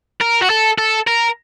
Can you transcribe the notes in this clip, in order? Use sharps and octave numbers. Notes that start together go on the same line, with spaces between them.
A#4
F#4
A4
A4
A#4